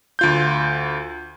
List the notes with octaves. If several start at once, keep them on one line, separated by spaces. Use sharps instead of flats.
D2 F4 G6